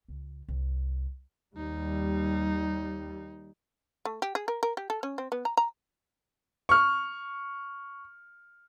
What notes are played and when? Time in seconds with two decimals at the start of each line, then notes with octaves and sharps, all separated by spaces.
0.08 C#2
0.48 C2
1.57 D#2 G3 D#4
4.05 A3
4.22 G4
4.35 G#4
4.48 A#4
4.63 A#4
4.77 G4
4.90 A4
5.03 C#4
5.18 C4
5.32 B3
5.45 A#5
5.57 A#5
6.69 C#6 F6